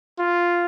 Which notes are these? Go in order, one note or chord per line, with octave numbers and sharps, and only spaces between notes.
F4